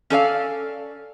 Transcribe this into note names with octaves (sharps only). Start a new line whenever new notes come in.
C#4 A4 D5 F5